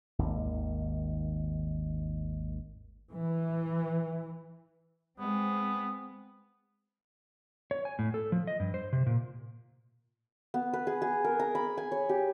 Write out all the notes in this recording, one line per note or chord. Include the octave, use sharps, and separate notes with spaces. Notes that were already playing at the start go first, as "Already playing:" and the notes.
G#1 D#2
E3
G#3 B3 C4
C#5
G#5
A2
A4
F3
D#5
G2
C5
C3
A#2
B3
B4
G#4
G#4
A#4
A#5
B5
G#5
C#5
G4